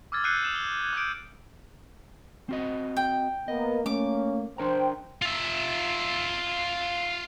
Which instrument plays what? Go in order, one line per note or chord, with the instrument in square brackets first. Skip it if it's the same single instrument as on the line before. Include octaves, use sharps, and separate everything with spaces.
[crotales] D6 E6 F6 G#6 A6
E6 F#6 G6 C7 C#7 D#7
D#6 E7 F#7
G7
G#6
D6 D#6 F#6 G6 D7
[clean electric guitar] C4 F#4 D#5
[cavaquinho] G5
[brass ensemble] A#3 B3 A#4 [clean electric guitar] D#5
[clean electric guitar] A3 [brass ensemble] A#3 C#4 [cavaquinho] D6
[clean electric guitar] D4 A#4 A#5 [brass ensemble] C5 G5
[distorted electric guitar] F4 E5